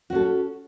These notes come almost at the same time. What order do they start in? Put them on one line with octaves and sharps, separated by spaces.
F#4 C#4 A4